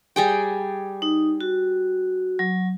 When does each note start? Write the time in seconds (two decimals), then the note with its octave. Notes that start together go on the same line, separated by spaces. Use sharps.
0.16 G3 G#4 G5
1.02 D#4
1.41 F#4
2.39 F#3